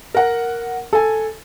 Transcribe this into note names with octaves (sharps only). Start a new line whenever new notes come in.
A#4 F#5
A4 G#5